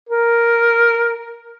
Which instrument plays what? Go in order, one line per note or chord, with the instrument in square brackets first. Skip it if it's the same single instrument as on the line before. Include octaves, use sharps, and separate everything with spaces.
[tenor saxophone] A#4